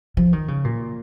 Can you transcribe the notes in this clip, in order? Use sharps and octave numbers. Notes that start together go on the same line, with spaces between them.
F3
D#3
C#3
A#2